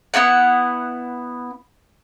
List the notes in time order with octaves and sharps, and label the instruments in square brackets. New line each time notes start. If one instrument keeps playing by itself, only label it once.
[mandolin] B3 D#4 E4 F#5